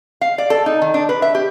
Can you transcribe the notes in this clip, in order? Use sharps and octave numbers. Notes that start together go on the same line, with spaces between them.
F5
D5
A4
D#4
D#3
D4
B4
E5
G4